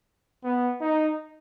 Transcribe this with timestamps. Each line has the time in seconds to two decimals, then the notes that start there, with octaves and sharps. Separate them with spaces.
0.44 B3
0.81 D#4